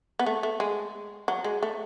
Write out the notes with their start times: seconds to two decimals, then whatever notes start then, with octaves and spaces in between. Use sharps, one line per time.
0.19 B3
0.26 A3
0.43 A3
0.60 G#3
1.28 F#3
1.44 G#3
1.63 A3